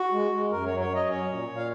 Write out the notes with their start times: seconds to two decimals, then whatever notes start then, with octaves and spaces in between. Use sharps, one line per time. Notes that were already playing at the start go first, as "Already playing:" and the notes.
Already playing: F#4
0.12 G#3
0.32 G#3
0.51 F#2 A#4
0.66 F#3 C#5
0.80 C#5
0.90 F#3
0.95 D#5
1.09 C#4 C#5
1.29 A#2
1.49 A#2
1.57 F5